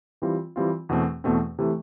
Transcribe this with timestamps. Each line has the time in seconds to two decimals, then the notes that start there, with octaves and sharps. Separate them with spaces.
0.22 E3 G3 C4 F4
0.56 E3 G3 C4 F4
0.89 E2 B2 A3 C4
1.24 E2 B2 A3 C4
1.59 C3 E3 A3